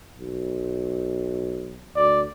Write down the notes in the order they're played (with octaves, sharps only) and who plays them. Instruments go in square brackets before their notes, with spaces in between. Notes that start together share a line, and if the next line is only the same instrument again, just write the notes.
[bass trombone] B1
[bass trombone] D2 [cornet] D5